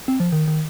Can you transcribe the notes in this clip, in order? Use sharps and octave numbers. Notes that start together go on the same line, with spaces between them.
C4
F3
D#3
D#3